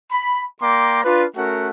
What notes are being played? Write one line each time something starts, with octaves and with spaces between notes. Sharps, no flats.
B5
A#3 D5 G5 A#5 C6 D6
D4 F4 B4
A3 C#4 F#4 A#4 F#5